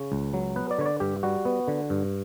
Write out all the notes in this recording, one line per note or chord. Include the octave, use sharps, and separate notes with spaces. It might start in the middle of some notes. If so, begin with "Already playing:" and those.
Already playing: C#3 C#5
C#2
F#3
B3 B4
D5
D3 C#5
D5
G2 G4
G3 F#4
B3
D3
G2